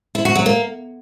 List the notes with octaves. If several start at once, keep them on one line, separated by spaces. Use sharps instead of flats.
E4
F#4
F#3
A#3